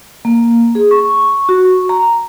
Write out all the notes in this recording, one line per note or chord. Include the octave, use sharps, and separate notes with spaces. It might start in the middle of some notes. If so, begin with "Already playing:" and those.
A#3
G#4
C#6
F#4
C#6
A#5